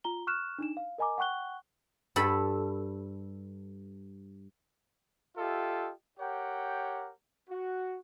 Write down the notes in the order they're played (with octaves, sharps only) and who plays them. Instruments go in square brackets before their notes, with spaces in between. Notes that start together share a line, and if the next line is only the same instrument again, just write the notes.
[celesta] F4 A#5 G7
C#6 F6 F#6 E7
D4 D#4 E7
F5
A#4 D#5 G#5 A#5 D6
F#5 G5 C#6 F#6 G7
[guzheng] G2 A4 B5
[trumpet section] F4 G4 A4 D#5 E5
G4 A#4 C#5 F#5 G5
F#4